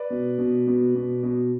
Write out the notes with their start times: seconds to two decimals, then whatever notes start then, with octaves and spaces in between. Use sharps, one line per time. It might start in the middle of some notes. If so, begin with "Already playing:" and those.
Already playing: B4 D5
0.10 B2
0.38 B2
0.67 B2
0.95 B2
1.23 B2